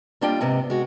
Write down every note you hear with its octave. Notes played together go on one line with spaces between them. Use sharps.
G3 A#3 D4 F4 D#5 G5
G#2 C3 B3
G#3 F#4